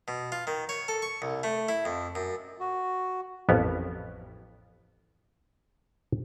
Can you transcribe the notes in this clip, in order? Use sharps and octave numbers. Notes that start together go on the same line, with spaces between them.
B2
F4
D#3
C#5
A4
C#6
C2
A3
E4
F2
F#2
F#4
A1 F2 B3 C#4 A#4